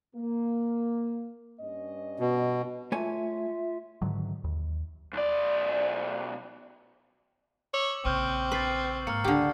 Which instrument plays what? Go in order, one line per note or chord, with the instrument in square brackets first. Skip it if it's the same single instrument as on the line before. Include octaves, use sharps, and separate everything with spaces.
[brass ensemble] A#3
G2 C#4 D#5
[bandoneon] B2
[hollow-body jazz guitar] A3 C#5 G#5 [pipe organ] F4 E5
[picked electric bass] G#2 D3 D#3 F#3
D#2
[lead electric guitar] B1 D5
[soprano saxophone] C#5 [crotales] D6 E6 F#7
[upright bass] A#1 C#3 [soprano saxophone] C4 [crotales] C#6 F6 G6
[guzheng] B4 [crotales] A6 C7 F#7
[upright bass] G#2 [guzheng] A#3 [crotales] F6 C#7
[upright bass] C#2 [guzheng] D3 G4 [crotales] F6